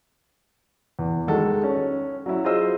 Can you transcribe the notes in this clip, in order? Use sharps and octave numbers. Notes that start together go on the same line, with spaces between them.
E2
D#3 G#3 F#4 A4
C#4
F#3 C#4 E4
F4 G#4 C5 D#5 E6